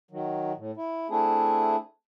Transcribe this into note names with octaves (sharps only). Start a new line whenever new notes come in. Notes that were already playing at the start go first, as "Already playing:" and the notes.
D#3 F#3
A2
E4
A3 C4 D4 E4 G#4